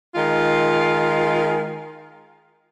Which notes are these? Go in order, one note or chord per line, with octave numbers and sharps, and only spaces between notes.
D#3 G#3 F4